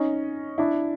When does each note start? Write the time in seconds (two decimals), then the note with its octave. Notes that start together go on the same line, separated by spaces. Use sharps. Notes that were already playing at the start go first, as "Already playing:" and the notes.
Already playing: C#4 D#4
0.58 D4 E4